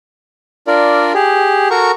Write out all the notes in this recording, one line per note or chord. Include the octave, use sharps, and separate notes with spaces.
D4 F4 A#4 D5
G4 G#4
F#4 A4 A#4 A#5 C#6